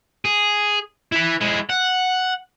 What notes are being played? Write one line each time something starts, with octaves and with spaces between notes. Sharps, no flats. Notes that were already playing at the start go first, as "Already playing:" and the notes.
G#4
E4 B4
G#3 E4
F#5